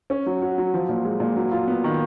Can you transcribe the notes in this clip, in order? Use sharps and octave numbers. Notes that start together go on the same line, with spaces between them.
C#4
F#3
F#4
F#3
F3
A#2
G#3
A#2
F#3
F4
B3
D#3